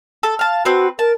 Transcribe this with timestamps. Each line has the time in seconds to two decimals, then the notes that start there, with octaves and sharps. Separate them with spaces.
0.23 A4
0.39 F5 A5
0.65 C4 F#4 B4
0.99 A#4 A5